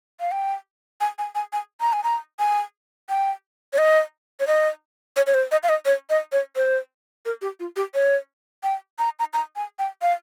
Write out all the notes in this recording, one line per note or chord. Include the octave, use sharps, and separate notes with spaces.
F5
G5
G#5
G#5
G#5
G#5
A#5
G#5
A#5
G#5
G5
C#5
D#5
C#5
D#5
C#5
C#5
C5
D#5
F5
D#5
C#5
D#5
C#5
C5
A#4
G4
F4
G4
C#5
G5
A#5
A#5
A#5
G#5
G5
F5